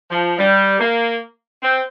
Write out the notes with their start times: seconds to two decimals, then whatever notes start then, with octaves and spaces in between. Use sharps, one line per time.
0.11 F3
0.38 G3
0.79 A#3
1.63 C4